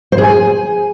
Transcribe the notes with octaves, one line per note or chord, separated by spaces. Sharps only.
C5
G#4
G#5